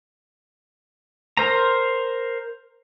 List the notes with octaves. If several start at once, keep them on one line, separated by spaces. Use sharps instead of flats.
A#4 C5 A#5